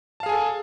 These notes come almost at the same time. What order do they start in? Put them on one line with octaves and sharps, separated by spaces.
A5 F5 G#4 G#5 A4